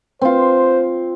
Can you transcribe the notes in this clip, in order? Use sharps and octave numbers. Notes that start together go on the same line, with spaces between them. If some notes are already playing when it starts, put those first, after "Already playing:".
C4 F4 C5